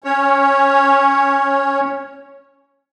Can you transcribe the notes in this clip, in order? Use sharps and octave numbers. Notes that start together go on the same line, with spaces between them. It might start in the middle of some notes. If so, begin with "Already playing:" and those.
C#4 C#5